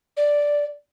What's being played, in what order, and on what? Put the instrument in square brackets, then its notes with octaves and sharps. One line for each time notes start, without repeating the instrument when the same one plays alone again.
[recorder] D5